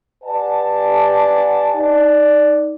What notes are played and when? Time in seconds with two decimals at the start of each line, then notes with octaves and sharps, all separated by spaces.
0.24 G4 B4 D5 F#5 G#5 A5
1.74 D#4 D5